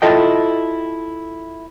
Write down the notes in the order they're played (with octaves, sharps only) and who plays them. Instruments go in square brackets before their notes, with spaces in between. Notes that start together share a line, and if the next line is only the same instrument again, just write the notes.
[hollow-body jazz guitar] E4 F4 A4 D#5 G5